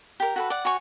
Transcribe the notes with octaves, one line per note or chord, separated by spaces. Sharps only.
G4 A#4
F#4 A4 B4
D5 F#5
F#4 C#5 G#5 C#6